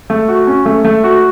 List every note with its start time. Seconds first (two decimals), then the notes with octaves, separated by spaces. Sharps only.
0.10 A3
0.28 F#4
0.47 C#4
0.66 A3
0.84 A3
1.04 F#4